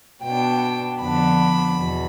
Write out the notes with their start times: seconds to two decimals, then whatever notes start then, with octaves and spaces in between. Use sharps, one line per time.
0.23 B2 B3 D4 G5
1.00 F2 D3 F3 B3 D4 B5
1.77 E2 B2